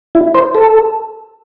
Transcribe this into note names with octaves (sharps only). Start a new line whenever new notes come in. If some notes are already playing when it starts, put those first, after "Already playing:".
E4
C5
A4